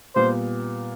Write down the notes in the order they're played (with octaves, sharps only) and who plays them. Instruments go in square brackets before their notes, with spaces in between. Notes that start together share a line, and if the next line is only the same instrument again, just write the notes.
[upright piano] A#2 G3 B3 [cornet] C5